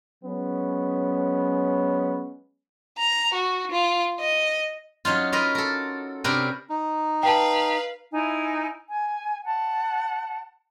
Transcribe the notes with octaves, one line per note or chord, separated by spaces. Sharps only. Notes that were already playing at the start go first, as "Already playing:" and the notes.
F#3 G#3 B3 C#4
A#5
F#4
F4
D#5
F#3 C#4 D#4 F4
F4 F#4 A#4 B4 D#5
A4 A#4
C3 C#4 D4 A#4 B4
D#4
B4 F5 G5 A5
D#4 E4 G#5
G#5
F#5 A5